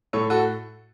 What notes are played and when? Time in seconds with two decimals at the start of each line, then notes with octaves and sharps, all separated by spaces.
0.13 A2 A4 C#5
0.30 F#4 A4